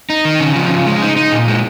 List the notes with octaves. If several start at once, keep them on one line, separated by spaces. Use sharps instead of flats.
D#4
D#3
C#3
F3
C#3
G#3
D#4
D#4
A#2
G#3